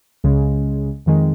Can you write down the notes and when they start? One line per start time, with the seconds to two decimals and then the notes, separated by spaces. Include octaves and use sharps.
0.24 C#2 C#3 G#3
1.06 F2 D#3 G#3